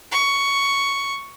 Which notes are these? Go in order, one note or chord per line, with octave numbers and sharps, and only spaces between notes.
C#6